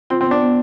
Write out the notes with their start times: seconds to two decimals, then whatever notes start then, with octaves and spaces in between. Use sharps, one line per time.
0.10 C4 F4
0.21 C4
0.26 B3
0.31 D4
0.42 B3